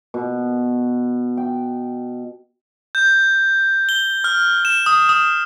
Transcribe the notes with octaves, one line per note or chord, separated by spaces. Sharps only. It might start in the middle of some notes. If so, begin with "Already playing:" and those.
B2
G5
G6
G7
F6
E7
D#6
D#6